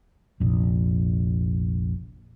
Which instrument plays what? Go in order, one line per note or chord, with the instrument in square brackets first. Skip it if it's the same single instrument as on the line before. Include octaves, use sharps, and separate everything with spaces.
[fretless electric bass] F1 A#1